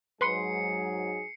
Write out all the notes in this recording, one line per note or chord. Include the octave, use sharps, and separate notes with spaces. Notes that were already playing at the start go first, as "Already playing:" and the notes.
G#2 F#3 G#4 B4 C6 C7 C#7